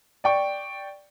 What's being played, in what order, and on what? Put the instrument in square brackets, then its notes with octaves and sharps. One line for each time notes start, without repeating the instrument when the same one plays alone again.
[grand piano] D5 G5 C#6